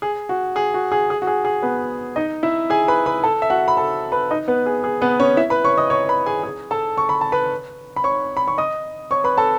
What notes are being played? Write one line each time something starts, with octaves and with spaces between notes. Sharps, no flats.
G#4
F#4
G#4
F#4
G#4
G#4
F#4
G#4
G#4
B3 B4
D#4 D#5
E4 E5
G#4 G#5
B4 B5
B4 B5
A4 A5
E5
F#4 F#5
B5
A4 A5
B4 B5
D#4 D#5
B3 B4
G#4
G#4
B3 B4
C#4 C#5
E4 E5
B4 B5
C#5 C#6
D#5 D#6
C#5 C#6
B4 B5
G#4 G#5
G#4 G#5
A4 A5
C#6
B5
A5
B4 B5
B5
C#5 C#6
B5
C#6
D#5 D#6
C#5 C#6
B4 B5
A4 A5